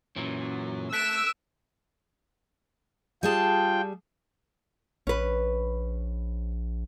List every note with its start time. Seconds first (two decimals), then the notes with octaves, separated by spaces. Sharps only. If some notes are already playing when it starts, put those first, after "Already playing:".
0.16 A#2 E3 F#3 C#4
0.93 A3 E6 F#6 B6 D7
3.23 G3 F4 G#4 G5 A5
5.07 A#1 C#4 B4